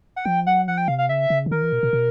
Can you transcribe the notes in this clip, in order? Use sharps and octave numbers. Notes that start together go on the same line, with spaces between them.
F#5
F3 G5
F#3 F#5
F3 F#5
G5
C3 F5
F5
C#3 E5
C#3
D3
D#3 A#4
E3
B2
B2
B2